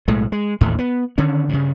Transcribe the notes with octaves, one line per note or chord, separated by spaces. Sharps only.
B1 A2 G#3 A3
G#3
A1 D#2 A2 A3
B3
D3 D#3 C#4
G2 C#3